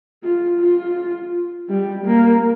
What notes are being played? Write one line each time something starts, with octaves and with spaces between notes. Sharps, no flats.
F4
F4
G3
A#3